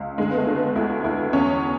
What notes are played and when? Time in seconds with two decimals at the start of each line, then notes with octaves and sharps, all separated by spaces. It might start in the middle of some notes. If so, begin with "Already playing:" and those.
Already playing: C#2
0.18 D3 G#3
0.31 B3
0.37 A3
0.47 D3
0.56 B3
0.76 D2 E4
1.04 D2 E4
1.33 E2 C#4